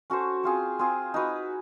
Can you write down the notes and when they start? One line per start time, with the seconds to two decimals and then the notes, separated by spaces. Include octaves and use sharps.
0.10 C#4 F#4 A4 C5
0.44 C4 F4 G#4
0.79 C4 F4 G#4
1.14 D#4 F#4 B4